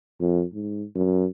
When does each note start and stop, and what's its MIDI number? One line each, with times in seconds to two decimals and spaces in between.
0.21 0.44 41
0.54 0.85 44
0.95 1.26 42